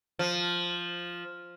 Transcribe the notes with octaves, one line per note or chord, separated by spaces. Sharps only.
F3